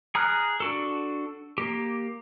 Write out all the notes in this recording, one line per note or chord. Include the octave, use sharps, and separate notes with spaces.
G#4 A#5 D#6 F6 F#6
D4 F#4 A4
A#3 G4